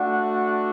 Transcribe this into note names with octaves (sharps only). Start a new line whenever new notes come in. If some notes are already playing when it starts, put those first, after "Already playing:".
Already playing: A3 D4 F#4 F#5